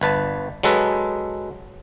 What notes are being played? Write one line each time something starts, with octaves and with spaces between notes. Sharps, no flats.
G1 B4 A5
F#3 G#3 A4 B4